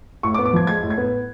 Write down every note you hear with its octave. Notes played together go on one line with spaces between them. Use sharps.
A2 C#6
D6
B3
D6
F3 G#6
G#3 G#6
A2
G#6
B3